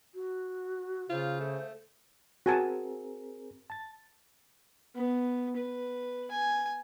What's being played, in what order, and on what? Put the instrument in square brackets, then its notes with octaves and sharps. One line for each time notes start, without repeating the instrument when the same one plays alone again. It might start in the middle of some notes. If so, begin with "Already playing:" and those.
[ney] F#4
[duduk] C#3 [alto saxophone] F4 [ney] C5
[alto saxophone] A3
[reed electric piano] C4 G#4 A#4 [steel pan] F#4 G#5 A5
[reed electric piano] A5 A6
[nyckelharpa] B3
B4
G#5